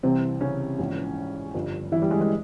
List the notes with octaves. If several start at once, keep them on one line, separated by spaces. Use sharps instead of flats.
C2 C3 E3 C4
C#3 C#4
A#1 G#2 E3
G1 G2 F3
E3 E4
G3
G#3
G#3